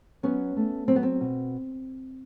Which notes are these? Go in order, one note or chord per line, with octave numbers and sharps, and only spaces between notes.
F#3 B3 C#4
A3
F#3 C4
B3
C4
B2